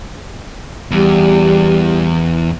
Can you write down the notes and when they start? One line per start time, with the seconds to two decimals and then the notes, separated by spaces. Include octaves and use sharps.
0.91 E2 G3